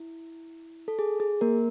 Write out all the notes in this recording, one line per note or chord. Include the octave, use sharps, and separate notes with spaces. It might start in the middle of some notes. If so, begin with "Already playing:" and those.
Already playing: E4
A4
G#4
G#4
A#3 A#4